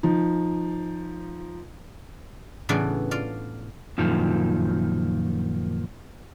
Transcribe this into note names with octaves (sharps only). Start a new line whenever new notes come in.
F3 D#4
A2 C#3 E3 B3 D4 D5
F4 D5 F5
F#2 A#2 D#3 F3